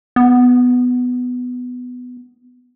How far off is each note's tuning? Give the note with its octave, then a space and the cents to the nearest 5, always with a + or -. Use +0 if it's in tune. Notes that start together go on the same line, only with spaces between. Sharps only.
B3 +10